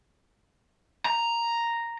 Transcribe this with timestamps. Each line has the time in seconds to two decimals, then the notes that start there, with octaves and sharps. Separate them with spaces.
1.05 A#5